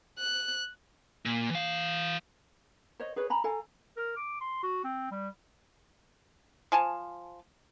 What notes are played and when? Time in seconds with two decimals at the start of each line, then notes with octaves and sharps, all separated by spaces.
0.19 F#6
1.25 A#2
1.51 E3 F5
3.00 C5 C#5 D#5
3.16 G#4 B4 C#5
3.30 G#5 A#5 B5
3.44 A4 F5 G#5 A#5
3.97 A#4
4.16 D6
4.41 C6
4.63 F#4
4.84 C4
5.11 G3
6.72 F3 G#5 A5